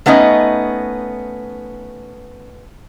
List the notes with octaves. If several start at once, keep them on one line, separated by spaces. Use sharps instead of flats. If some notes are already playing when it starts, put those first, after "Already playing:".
A3 B3 C#4 D#4 D#5